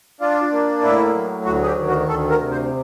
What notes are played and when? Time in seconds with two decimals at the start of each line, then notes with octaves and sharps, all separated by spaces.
0.21 D4 F4
0.52 A#3
0.83 A2 E4
1.14 F#3
1.45 D2 F#4
1.62 G#4
1.66 G4
1.78 D#3
1.88 F#4
2.08 D2 A4
2.30 A#4
2.40 C3
2.51 C5